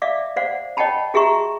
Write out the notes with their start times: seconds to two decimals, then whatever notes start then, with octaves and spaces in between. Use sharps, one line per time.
0.02 D5 E5 F5 D6
0.36 C5 D5 F5 F#5
0.77 C#5 D#5 F#5 G5 A5 B5
1.14 F#4 G#4 E5 A#5 C#6